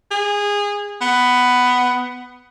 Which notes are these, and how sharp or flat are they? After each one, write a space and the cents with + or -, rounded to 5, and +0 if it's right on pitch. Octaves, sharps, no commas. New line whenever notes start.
G#4 -20
B3 +10